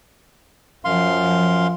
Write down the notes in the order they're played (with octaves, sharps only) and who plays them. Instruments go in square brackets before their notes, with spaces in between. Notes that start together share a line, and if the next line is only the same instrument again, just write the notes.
[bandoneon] F#2 F5 C6 [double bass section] F3